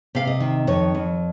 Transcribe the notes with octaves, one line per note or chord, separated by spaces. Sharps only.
C3 F5
D#5
D#3
F2 C#5
F2